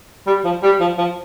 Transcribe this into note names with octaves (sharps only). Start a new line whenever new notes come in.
G3
F3
G3
F3
F3